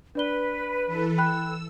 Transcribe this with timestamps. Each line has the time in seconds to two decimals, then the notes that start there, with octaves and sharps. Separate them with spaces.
0.15 D4 B4 D5 G7
0.85 E3 A4
1.18 G5 B5 E6 F#6